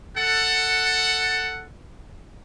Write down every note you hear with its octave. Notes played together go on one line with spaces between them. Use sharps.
A4 F#5